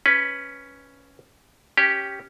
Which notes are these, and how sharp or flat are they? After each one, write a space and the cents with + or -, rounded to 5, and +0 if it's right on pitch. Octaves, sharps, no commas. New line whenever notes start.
C#4 +0 B4 +0
C#4 +0 G4 +0